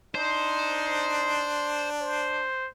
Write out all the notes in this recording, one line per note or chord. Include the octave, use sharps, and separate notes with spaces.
D4 D#4 C5
C5